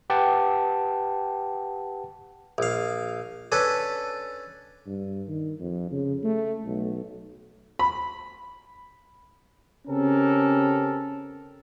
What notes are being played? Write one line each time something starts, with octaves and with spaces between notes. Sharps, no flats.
G4 B4 F#5 G5 A5
A#1 F5
C#4 D4 A4 B4
G2
D#3
F2
C#3
A3
B1
B5
C#3 C4 C#4 G4 A4 A#4